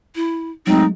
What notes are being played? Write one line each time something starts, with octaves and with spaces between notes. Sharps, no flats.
E4
F#3 G#3 A3 C4 D#4